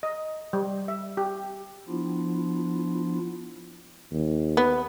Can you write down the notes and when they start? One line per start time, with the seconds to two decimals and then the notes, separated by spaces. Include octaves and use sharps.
0.03 D#5
0.53 G3
0.88 E5
1.17 G4
1.88 F3 B3 D4 E4 F4
4.11 D#2
4.57 B3